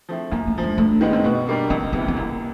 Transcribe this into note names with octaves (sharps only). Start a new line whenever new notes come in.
F3 A3 C4 E4
F#2 A#3
A3
D3 F3
G#3
G2 A3
D#3 G#3 B3
C4
B2 B3
G3 A#3 D4
C#2 C4
C3 E3 B3
B3
C2 A#3